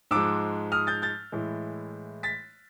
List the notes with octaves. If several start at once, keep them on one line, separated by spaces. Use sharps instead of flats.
G#2 F3 G#3 D6 E6
D#6 F6
G6 A6
G6 A6
A2 E3 G#3
A6 B6